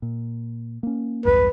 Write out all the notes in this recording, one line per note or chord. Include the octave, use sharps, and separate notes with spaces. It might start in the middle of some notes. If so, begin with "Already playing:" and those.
A#2
A#3 C#4
B1 E2 G2 B4